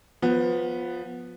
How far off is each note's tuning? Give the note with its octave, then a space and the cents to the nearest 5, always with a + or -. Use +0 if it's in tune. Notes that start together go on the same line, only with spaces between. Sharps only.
F3 +20 B3 +0